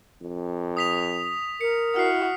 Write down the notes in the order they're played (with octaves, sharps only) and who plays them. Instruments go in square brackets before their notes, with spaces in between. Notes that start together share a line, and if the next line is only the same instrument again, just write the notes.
[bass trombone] F2
[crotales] D#6 B6 F7
[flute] A#4 [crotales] C#7
[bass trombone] E4 [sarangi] F#4 [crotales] F6 C7